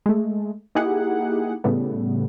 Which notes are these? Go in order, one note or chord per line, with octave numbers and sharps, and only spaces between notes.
G#3 A3
A#3 D#4 E4 G4 G#4 F#5
A2 C#3 G3 A3 B3